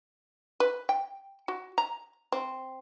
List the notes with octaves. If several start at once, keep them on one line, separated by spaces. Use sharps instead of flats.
B4
G5
F#4
A#5
C4